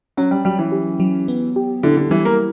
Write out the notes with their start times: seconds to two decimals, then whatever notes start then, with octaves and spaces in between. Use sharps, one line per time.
0.17 F#3 C#4
0.31 G3
0.45 F#3 G3
0.59 E3
0.72 G4
1.00 F#3
1.28 B3
1.56 G4
1.83 D3 E4
1.97 D3
2.11 E3 G3
2.25 A#3